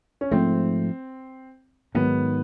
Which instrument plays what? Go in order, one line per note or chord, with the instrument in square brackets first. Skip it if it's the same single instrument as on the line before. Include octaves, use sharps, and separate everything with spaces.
[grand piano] C#4
[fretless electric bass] G#2 F3 A3 [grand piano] C4
[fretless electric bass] G#2 D#3 F#3 [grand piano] B3